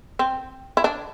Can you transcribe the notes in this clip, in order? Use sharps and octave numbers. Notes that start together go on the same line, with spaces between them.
C4
E4
D4